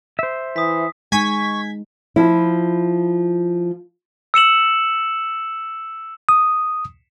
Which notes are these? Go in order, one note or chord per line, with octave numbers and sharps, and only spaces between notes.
C5 E5
E3 D#6 B6
G#3 D#4 G#5 C#6 G#6 B6
F3 E4
E6 C#7 E7 F#7
D#6